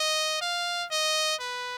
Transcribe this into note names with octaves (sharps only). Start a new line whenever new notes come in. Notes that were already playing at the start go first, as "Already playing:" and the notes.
Already playing: D#5
F5
D#5
B4